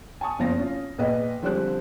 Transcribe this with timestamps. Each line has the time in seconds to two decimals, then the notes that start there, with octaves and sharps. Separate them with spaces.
0.21 G#5 A5 C#6 D#6
0.39 F#1 B2 F3 C4 F5 A#6
0.58 C#4 F4
0.98 A#1 G#4 B4 D#5
1.42 D3 F3 G3 G#3 C4 F#6